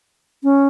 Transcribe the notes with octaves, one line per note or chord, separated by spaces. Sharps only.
C#4